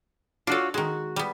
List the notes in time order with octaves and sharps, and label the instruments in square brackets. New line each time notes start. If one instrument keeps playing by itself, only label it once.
[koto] D4 A4 [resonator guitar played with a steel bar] F4 F#4 C#5
[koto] D#3 G#3 [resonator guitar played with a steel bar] F#4
[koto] G3 B3